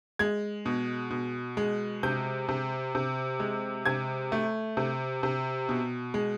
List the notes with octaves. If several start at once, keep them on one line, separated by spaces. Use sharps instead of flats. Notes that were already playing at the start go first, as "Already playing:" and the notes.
G#3 G#6
B2
B2
G#3
C3 G6
C3
C3
G#3
C3 G#6
A3
C3
C3
B2
G#3